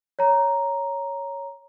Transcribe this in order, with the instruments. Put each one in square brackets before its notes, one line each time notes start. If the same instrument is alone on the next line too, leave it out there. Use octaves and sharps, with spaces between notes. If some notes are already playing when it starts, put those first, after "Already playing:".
[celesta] C#5 A#5